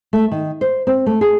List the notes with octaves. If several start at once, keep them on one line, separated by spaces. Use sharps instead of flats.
A3
D#3
C5
C4
A3
G#4